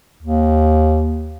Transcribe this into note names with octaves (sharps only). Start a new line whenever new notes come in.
D#2